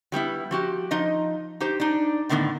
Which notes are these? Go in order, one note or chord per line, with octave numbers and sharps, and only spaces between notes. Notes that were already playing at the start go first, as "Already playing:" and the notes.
F#3 G3 B3 E4
F3 F#4 G4
F3 D#4 D#5
D#4 G4 C5
D4 D#4
A2 D3 D#3 G#3 B3